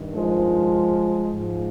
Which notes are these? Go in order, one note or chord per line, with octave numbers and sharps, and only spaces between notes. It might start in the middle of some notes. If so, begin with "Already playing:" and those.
Already playing: G2 D#3
F3 G#3
G#2 F3